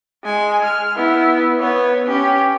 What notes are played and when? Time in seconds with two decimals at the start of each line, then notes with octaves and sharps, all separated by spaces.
0.24 G#3 G#5
0.64 F6
0.96 B3 E4
1.59 B3 C#5
2.06 C#4 G4